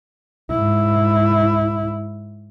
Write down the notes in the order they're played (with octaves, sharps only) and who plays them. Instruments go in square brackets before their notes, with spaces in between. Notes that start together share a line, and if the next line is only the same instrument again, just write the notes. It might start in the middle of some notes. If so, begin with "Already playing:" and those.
[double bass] G#2 E4